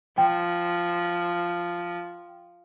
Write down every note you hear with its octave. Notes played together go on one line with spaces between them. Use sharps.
F3 G5